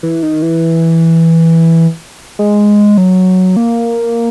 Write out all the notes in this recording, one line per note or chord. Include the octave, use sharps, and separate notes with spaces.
E3
D#3
E3
G#3
F#3
A#3